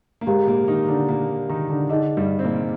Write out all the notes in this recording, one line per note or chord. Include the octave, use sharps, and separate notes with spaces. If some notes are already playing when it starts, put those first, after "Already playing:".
A#3
G#2 G#3 G4 A#4 F5 A#5
A#2 A#3
D#3 D#4
D3 D4
A#2 A#3
D#3 D#4
D3 D4
D3 D4 D#4 G#4 D#5
G2 G3
C4
A#2 A#3